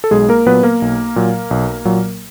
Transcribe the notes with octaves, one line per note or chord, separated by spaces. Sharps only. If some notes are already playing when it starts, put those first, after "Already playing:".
A4
B1 G#3 G#4
A#3 A#4
A#2 F#3 B3 B4
A#3 A#4
B1
A#2 F#3
B1
A#2 F#3